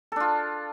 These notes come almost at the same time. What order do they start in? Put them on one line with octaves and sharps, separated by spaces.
A4 D4 F4